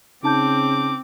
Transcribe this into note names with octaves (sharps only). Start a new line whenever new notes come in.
C#3 C4 D#4 A5 D6 G6